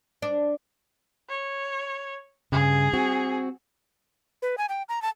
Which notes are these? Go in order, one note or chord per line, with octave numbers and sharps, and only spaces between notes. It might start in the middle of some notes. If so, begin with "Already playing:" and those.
D4
C#5
G2 C#3 G#4
C4 F#4
B4
G#5
G5
A#5
A5